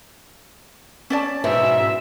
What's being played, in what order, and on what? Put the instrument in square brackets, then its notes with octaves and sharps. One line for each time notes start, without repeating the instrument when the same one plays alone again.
[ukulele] C#4 D5 A5
[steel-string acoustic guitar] G#2 B2 E3 [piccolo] E5